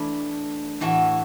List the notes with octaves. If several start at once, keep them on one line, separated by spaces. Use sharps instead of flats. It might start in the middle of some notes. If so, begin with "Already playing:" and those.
Already playing: E3 A3 D4 B4
A2 E3 A3 F#4